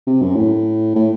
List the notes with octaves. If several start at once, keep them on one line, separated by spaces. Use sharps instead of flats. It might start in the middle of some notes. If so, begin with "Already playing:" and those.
C3
F#2
A2
A2